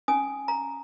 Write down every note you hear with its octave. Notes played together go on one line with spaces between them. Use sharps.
C#4 G#5 D#6
A#5